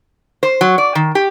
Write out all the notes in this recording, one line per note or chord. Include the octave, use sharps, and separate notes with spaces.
C5
F#3
D5
D#3
G4